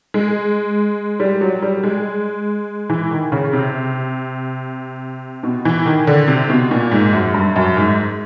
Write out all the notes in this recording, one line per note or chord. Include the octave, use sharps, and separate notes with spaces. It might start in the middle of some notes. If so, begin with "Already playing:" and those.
G#3
G3
F#3
G3
G#3
E3
D#3
C#3
C3
B2
E3
D#3
D3
C3
B2
A#2
G#2
F#2
G2
F#2
G#2